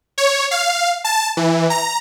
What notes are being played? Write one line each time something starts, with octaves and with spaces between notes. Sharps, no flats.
C#5
F5
A5
E3
A#5